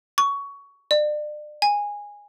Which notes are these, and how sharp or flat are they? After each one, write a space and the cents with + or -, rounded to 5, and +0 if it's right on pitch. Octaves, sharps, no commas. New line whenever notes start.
C#6 +15
D5 +35
G#5 -15